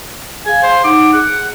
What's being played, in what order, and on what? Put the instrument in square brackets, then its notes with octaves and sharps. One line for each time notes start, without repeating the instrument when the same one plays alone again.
[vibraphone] G#4 F5 [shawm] G#5
[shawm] C5
[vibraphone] D#4 F#5 [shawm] D6
[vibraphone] G#4 [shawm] F#5